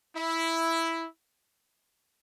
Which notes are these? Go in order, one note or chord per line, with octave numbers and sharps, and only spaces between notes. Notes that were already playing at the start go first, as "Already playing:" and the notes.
E4